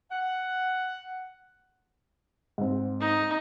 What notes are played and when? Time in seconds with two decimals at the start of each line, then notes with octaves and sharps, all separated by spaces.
0.12 F#5
2.58 G#2 C4
3.00 D#4